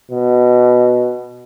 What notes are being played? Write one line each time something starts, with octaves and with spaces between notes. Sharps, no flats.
B2